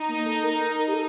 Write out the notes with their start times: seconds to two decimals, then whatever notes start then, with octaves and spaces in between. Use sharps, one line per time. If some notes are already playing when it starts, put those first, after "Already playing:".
Already playing: D#4
0.08 A#3
0.26 A4
0.43 A#4
0.88 G4
0.94 A4